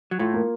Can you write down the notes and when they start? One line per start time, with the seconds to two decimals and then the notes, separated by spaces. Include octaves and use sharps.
0.11 F#3
0.19 A2 A3 F4
0.34 A#3